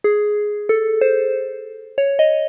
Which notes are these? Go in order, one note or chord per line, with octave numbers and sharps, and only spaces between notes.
G#4
A4
C5
C#5
D#5